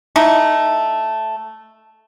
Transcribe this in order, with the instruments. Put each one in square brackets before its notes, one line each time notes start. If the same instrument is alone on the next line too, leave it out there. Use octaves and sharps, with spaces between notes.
[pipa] A3 D#4 E4